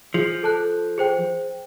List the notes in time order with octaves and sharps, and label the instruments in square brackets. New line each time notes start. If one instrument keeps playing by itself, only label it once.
[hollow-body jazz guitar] F3 [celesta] G#4
[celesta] A4 A5 F#6
G#4 C5 G5